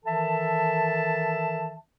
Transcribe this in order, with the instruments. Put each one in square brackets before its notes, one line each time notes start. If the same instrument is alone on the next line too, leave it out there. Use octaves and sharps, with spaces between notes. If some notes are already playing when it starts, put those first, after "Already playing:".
[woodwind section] D#3 E3 A4 E5 A5